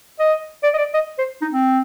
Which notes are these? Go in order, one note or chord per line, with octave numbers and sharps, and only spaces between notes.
D#5
D5
D#5
D5
D#5
C5
D#4
C4